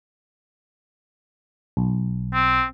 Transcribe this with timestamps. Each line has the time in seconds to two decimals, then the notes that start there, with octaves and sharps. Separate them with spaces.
1.77 B1
2.34 C4